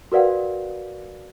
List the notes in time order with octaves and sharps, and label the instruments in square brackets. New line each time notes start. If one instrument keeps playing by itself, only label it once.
[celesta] F#4 A#4 B4 D5 F5 F#5